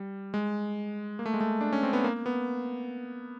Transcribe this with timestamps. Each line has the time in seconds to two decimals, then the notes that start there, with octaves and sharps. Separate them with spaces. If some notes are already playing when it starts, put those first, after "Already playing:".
Already playing: G3
0.34 G#3
1.19 A#3
1.26 A3
1.34 G#3
1.41 A3
1.61 D4
1.73 C#4
1.83 C4
1.93 B3
2.04 A#3
2.26 B3